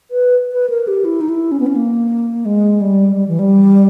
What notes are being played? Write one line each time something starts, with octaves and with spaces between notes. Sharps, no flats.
B4
B4
A#4
G4
E4
D#4
E4
C#4
B3
C#4
A#3
G#3
G3
G3
E3
G3